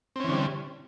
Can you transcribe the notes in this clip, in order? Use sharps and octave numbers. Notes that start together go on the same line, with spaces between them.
D3 E3 G3 C4 C#4